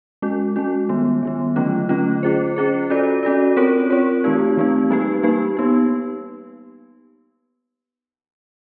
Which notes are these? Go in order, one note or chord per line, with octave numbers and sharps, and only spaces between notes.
G#3 C#4 F#4
G#3 C#4 F#4
D#3 G3 B3
D#3 G3 B3
D3 F#3 A3 C#4 F4
D3 F#3 A3 C#4 F4
C#4 F4 G#4 C5
C#4 F4 G#4 C5
C#4 F#4 A4 D5
C#4 F#4 A4 D5
C4 F4 A#4 C#5
C4 F4 A#4 C#5
E3 A3 C4 D#4 G4
E3 A3 C4 D#4 G4
G3 A#3 D#4 G4 B4
G3 A#3 D#4 G4 B4
B3 D#4 G4